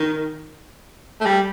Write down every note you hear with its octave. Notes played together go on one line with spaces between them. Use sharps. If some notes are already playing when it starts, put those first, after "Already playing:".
Already playing: D#3
A3
G3